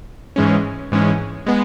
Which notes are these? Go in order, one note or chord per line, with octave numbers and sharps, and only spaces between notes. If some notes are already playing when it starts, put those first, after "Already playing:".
G#2 E3 G#3 C#4
G#2 E3 G#3 C#4
G#3 B3